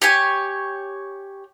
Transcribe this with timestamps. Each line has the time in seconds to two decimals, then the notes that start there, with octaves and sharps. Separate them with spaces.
0.02 G4 C#5 G#5